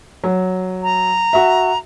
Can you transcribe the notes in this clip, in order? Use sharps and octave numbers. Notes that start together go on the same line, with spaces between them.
F#3
A#5
F#4 E5